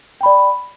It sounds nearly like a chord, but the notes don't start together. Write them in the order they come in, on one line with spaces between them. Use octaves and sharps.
G5 B5 D5